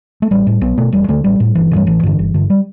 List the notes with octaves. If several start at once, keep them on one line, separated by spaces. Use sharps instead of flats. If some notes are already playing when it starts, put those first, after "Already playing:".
A3
A1 G3
A2
B1 B3
B2 A3
E1 G3
D2 D3 A3
A1 G3
A2
G1 E3
D3
G2 G3
A1 E3
G2 D3
G1
G2 D3
G3